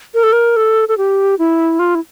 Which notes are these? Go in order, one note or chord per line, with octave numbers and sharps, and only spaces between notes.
A#4
A4
A#4
A4
A4
G4
E4
F4
E4